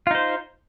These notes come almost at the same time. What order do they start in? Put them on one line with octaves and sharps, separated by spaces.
F4 D#4 C5